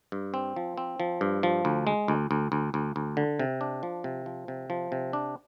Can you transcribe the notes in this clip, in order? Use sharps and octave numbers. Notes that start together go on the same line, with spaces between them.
G2
C4
F3
C4
F3
G2
F3
D2
G#3
D2
D2
D2
D2
D2
D3
C3
D4
F3
C3
F3
C3
F3
C3
D4